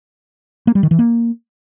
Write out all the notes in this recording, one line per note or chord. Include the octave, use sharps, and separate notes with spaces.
A#3
G3
D#3
E3
A#3